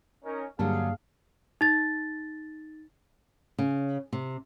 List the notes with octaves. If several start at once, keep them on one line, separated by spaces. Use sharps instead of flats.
C#4 D#4 A#4
G2 D3 F#3 G3 A#3 G#4 F5 A5
D#4 A6
C#3
C3